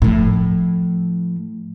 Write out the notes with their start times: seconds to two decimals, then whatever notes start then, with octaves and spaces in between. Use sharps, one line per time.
0.02 A2 F3